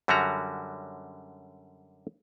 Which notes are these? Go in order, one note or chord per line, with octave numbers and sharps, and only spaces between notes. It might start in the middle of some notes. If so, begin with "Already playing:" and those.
F#2 D3 G3 C#4 F#4 A#5